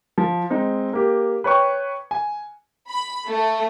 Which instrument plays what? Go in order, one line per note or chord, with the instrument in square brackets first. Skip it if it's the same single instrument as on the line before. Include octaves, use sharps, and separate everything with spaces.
[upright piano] F3
G#3 C4 D#4
A#3 G4
B4 C#5 G5 C#6
G#5
[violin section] B5
A3